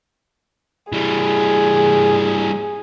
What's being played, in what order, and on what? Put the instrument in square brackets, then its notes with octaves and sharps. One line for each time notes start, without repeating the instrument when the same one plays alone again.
[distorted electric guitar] E3 G3 [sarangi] G#4